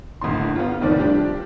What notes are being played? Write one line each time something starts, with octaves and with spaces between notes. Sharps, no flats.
G1 D#2 A2 C6
B3 F4
F1 A2 D#3 F3 D5
F3 G3 D4 G4